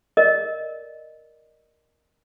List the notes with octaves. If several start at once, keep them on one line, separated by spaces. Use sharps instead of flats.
A#4 D5 D#5